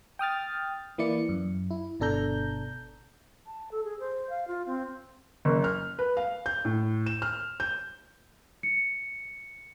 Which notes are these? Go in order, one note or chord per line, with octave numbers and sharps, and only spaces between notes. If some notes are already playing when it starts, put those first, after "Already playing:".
G5 D#6 F6 A6
E3 A#3 E4 D5 C#7
F#2
E4
G1 B2 D4 A4 A#5 G6
A5
A4
G#4
C5
F5
F4
C4
F#1
F6
B4
F5
G6
A2
E7
F6
G6
C#7